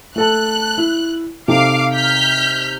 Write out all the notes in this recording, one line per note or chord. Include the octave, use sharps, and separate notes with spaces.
A3 A4 A5 F#6
E4
C3 D#4 A4 F5 D6 C7
F6 G6 B6